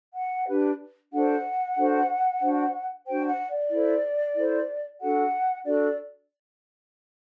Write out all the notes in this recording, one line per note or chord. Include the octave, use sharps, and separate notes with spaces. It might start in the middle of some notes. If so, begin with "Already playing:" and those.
F#5
D4 G4 B4
D4 F#4 A4 C5 F#5
D4 F#4 A4 C5
D4 F#4 C5
D4 F#4 C5 G5
F#5
D5
E4 A4 C5
E4 A4 C5
D4 F#4 A4 F#5
D4 F#4 A4 D5